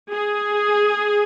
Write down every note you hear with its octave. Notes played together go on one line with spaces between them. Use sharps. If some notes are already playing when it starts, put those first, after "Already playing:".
G#4